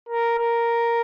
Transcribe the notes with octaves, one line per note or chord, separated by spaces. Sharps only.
A#4
A#4